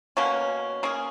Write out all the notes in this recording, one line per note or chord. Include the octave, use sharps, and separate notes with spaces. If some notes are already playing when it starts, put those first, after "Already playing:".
B2 A#3 C#4
A#3 C#4 G#4